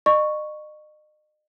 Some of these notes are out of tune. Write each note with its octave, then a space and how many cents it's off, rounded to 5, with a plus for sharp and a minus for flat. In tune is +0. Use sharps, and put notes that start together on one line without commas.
D#5 -40 C#6 +0